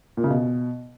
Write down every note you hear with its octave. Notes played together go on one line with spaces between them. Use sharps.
A#2
C#3
B2